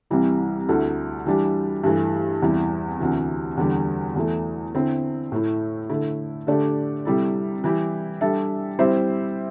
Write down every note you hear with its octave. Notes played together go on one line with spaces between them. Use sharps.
C2 C3 E3 G3 E4
D2 D3 A3 E4
E3 G3 D4 G4
G2 E3 A3
E2 C3 G3 E4 G4
D2 C3 E3
E2 D3 G3
E2 E3 A3
D3 C4 E4
A2 A3 E4
D3 A3 E4 A4
D3 A3 D4 G4 D5
C3 G3 E4 A4
E3 G3 E4 G4
G3 D4 A4 E5
G3 C4 E4 C5 E5